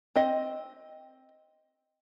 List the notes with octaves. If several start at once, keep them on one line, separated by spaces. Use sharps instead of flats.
C4 D#5